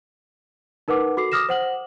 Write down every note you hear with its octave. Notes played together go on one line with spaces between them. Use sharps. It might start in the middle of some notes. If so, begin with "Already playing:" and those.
D#4 A#4 B4 F#5 D6
F#4 A4 D6 C7
D6 D#6 F6 A#6 E7
C5 F#5 F#7